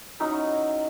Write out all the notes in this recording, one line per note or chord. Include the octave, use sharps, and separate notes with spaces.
F#3 C#4 D#4 E4